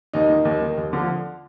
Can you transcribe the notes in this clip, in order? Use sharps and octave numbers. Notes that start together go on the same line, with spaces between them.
D#2 D#4
D#3
D#2
D#3
D#2
D3 F3